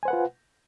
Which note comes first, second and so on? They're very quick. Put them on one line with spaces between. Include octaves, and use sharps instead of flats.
G#5 C5 F#5 B4 F4